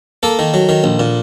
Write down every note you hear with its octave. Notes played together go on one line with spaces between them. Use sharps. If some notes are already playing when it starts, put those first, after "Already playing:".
A#3 A4
D#3
F#3
D#3
A#1
A#2